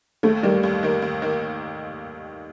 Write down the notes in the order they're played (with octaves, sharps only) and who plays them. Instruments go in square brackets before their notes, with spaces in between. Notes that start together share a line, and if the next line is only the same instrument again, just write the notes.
[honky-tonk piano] D#2 [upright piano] A3
[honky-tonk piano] D#3 A#3 [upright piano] G3
[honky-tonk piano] D#2
D#3 A#3
D#2
D#3 A#3